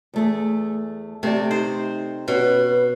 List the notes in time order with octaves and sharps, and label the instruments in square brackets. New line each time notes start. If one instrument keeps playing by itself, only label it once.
[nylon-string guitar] E2 A3 G#4
[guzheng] C3 [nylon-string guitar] A3 D5
[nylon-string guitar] D#4 [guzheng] C5
[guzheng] B2 [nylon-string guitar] C#4 [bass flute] B4